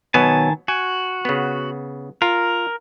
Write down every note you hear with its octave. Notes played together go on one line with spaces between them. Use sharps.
B2 D#3 F#3 B3 G#5 A5
F#4 G#5
C#3 B3
F4 A#4